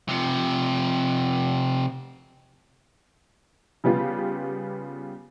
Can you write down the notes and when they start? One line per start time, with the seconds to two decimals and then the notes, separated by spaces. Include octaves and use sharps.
0.09 C3 F3
3.84 C#3 G3 B3 F4 G4